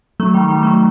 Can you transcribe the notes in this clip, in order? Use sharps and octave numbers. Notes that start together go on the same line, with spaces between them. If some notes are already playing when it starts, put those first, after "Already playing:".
F#3 A3
D#3 G3
D#3 G3
F#3 A3